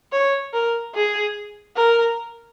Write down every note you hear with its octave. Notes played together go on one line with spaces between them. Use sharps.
C#5
A#4
G#4
A#4